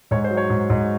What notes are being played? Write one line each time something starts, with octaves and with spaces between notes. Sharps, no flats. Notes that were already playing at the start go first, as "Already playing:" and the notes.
G#2 C#5
C5
F#3
C#5
G#2
G#2